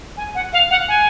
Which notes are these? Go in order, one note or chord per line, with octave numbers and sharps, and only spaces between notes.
G#5
F#5
F5
F#5
G#5